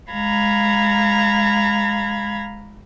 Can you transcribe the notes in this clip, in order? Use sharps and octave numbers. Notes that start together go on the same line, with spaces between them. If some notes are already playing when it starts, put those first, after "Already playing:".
G#3 F5 A#5 B5 G#6